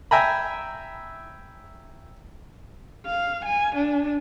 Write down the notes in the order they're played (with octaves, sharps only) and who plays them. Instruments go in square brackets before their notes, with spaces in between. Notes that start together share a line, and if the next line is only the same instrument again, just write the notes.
[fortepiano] E5 G5 G#5 A#5 B5
[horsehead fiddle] F5
G#5
D4